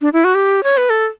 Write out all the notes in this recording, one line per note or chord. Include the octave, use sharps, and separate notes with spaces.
D4
E4
F#4
G4
C#5
B4
A4